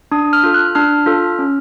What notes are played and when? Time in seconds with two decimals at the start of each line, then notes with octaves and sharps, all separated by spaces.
0.12 D4 D#6
0.33 F6
0.44 F4 A4
0.54 F#6
0.75 D4 F6
1.06 F4 A4
1.39 C#4